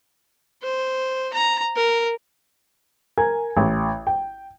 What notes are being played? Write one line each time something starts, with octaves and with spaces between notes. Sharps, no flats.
C5
A#5
A#4
A#4 G#5 G#6
A1
G5